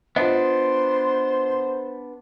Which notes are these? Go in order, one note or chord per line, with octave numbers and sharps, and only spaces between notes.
B3 D4 F4 C5 D#5 C6